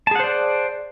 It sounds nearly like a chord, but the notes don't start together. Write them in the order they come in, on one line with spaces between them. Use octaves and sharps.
A5 G#4 F#5 C5 D5